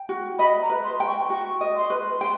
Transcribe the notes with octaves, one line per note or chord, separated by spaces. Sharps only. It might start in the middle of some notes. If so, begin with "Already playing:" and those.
Already playing: G5
F#4
D#5 B5
A#5
B4
C6
G5
C#6
F#4 C#6
D#5
C6
B4
G5 C6